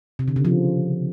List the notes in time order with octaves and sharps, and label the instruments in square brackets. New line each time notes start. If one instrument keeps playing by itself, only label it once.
[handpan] C3
D3
C#3
F3